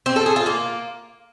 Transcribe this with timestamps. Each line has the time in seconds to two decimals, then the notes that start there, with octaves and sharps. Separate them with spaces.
0.06 C4
0.16 A4
0.26 G#4
0.36 F4
0.46 A#3